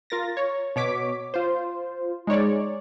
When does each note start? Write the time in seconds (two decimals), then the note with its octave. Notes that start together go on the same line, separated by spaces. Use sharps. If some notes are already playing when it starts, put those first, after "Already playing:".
0.10 F4 A#4 A6 A#6
0.37 C#5
0.76 B2 C#5 D6 B6
1.34 F4 C5
2.27 G#3 D#4 C#5 D5